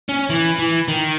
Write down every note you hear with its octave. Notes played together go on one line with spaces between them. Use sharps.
C#4
E3
E3
D#3